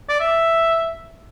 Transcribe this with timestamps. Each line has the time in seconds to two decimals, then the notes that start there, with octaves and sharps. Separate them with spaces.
0.09 D5
0.20 E5